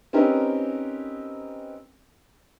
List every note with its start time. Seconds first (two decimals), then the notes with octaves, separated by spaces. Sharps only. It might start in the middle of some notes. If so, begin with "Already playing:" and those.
0.13 C4 C#4 D#4 G4 A#4 B4